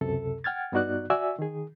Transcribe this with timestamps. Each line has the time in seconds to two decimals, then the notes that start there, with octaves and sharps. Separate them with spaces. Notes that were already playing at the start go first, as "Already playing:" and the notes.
0.01 C#2 F#2 C3 A4
0.44 F#5 G5 F6 G#6 A6
0.72 G2 B3 D#4 F#4 D5 F#6
1.10 F#4 D5 E5 G#5 E6
1.39 D#3 G#4